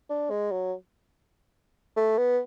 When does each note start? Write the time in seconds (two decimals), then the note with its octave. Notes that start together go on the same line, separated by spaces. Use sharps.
0.10 D4
0.30 G#3
0.51 F#3
1.97 A3
2.18 B3